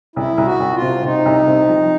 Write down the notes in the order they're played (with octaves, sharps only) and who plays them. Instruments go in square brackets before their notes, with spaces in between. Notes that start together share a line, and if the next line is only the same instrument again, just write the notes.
[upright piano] C2 [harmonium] E4
[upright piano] C2
[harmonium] F#4
[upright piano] C2
[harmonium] F4
[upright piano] C3
[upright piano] C3 [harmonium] D#4
[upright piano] C2
C3
F3